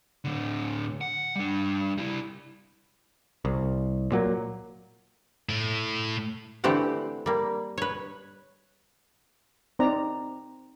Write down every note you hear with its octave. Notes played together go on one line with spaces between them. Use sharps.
A2 D3
F#5
G3 D4
G3 E4
C2
A#2 F#3 A#3
A2
D3 E3 A3 C4 G4 F#5
G3 A#3
B4 C#5
C4 D#4 D5 A#5